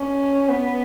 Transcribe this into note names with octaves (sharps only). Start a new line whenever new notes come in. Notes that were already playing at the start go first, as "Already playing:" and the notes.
Already playing: C#4
B3